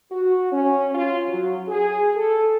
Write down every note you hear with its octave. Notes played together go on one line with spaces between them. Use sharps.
F#4
C#4
F4
F#3
G#4
A4